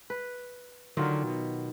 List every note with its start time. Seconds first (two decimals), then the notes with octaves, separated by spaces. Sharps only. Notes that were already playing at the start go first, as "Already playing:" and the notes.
0.10 B4
0.97 D3 D#3 F#3 F4
1.23 B2